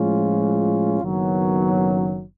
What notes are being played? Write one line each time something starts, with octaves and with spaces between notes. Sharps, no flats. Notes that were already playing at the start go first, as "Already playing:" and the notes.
Already playing: A2 F3 G#3 C#4 F4
F#1 F#2 D#3 F#3 B3